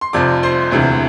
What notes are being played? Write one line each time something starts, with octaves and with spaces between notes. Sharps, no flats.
C6
F1 F2 C3 F3 D5 D6
C5 C6
E1 D2 C3 E3